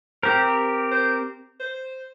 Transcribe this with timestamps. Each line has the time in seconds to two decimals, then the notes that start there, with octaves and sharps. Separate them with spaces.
0.23 C4 G4 A#4 C5
0.92 C5
1.60 C5